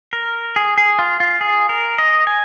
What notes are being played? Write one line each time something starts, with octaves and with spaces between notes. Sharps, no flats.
A#4
G#4
G#4
F4
F4
G#4
A#4
D#5
G#5